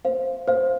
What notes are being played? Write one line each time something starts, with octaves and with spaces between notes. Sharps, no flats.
C5 F5
C5 F5